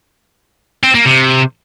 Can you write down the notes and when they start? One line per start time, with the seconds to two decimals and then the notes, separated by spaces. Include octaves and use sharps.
0.83 C4
0.95 A#3
1.06 C3